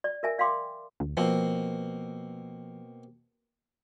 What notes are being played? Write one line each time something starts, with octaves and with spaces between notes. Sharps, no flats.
D5
A#4 E5 G#5
D5 F5 G5 C6 D6
D2
B2 F3 A#3 C4